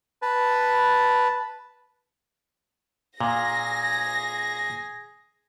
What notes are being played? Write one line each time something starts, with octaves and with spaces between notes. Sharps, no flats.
B4 A5
A#2 G#4 A#6